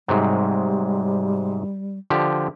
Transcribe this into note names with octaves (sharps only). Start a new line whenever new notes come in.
G#2 C3 F#3 G3
D3 F3 G4